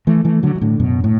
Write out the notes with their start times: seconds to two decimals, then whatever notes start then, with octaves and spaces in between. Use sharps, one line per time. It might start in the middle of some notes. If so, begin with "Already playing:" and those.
0.07 E3 A3
0.25 E3 A3
0.43 D3 F#3
0.55 E3
0.61 A2 D3
0.79 F#2 B2
1.04 A2